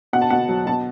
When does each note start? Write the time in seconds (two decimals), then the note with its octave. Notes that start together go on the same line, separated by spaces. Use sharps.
0.13 B2 F#5
0.22 A5
0.30 B2 F#5
0.48 F#3
0.67 B2 A5